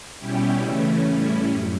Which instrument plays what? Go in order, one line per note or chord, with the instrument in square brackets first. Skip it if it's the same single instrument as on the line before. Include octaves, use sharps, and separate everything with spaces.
[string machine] B2 G3 C#4 E4 G4
C#3 E3 A3 C#4
A2 G3 C#4 E4
F#2